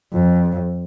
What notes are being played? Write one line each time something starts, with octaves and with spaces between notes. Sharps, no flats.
F2